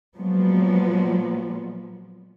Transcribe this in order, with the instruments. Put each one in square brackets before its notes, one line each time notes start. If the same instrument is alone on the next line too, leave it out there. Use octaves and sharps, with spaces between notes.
[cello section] A#2 F3 F#3 G#3 B3